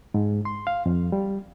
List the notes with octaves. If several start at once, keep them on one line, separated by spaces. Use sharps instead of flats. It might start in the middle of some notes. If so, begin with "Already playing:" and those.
G#2
C6
F5
F2
G3